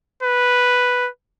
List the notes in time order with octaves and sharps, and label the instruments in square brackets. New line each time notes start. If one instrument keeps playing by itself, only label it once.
[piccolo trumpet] B4